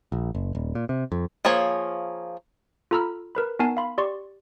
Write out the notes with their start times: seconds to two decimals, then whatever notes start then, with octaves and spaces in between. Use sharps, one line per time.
0.12 A#1
0.35 F#1
0.55 D#1
0.75 A#2
0.89 C3
1.12 F2
1.45 F3 A#3 G#4 C#5
2.91 F4 A4 A#5 B5 E6 F6
3.35 A#4 B4 B5
3.59 B3 D#4 A#4 G#5 A5 C7
3.77 F5 B5 C6
3.98 G4 D5 C6 C#6